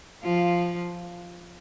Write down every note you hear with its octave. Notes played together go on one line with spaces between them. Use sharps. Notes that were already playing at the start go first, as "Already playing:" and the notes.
F3 F4